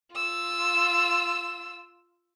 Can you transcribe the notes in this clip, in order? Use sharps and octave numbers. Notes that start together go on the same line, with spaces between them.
F4 E6